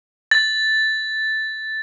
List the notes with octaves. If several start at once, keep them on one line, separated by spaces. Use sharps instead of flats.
A6